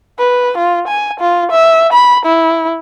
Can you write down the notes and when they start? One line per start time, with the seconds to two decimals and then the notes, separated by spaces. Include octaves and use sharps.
0.19 B4
0.57 F4
0.88 G#5
1.20 F4
1.52 E5
1.92 B5
2.25 E4